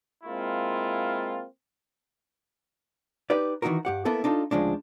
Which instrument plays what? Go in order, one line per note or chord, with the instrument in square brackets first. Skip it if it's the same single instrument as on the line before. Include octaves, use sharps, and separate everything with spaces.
[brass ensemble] G#3 A#3 C4 E4 F4
[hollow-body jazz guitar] D#4 G4 B4 D5
D#3 E3 C4 D#4 F#4 A#4
G2 G4 F#5
A#3 B3 E4 A4 A#4
D4 D#4 F4 A4
D2 C#3 F3 G#3 D4